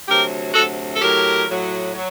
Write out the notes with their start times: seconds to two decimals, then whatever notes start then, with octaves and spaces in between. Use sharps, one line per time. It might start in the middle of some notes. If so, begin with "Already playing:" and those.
0.08 D2 C3 F#3 G4 A#4
0.54 D2 C3 F#3 F#4 A4
0.94 A4
1.01 A2 F#3 G4 A#4
1.48 A2 F#3
1.95 F#3